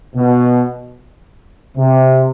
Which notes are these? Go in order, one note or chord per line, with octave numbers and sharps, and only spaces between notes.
B2
C3